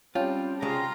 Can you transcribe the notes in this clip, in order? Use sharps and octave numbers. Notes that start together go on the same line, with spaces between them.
G3 C4 C#4 F4 G5 A5
C2 C#3 G#3 F4 A#5